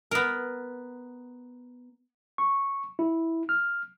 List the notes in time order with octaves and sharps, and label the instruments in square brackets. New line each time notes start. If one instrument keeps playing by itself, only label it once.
[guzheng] B3 A#4
[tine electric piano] C#6
E4
F6